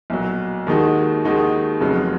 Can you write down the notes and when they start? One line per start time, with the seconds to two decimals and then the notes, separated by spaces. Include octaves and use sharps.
0.10 B1 A#2 F#3
0.67 D#2 D#3 G#3 D#4 F#4
1.24 D#2 D#3 G#3 D#4 F#4
1.80 F1 F2 C#3 F#3